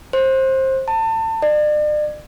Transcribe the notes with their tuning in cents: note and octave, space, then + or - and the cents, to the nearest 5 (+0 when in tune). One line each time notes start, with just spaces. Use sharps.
C5 +20
A5 +30
D5 +40